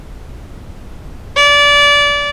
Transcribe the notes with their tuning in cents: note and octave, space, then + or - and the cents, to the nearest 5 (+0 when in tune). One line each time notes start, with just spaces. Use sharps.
D5 -25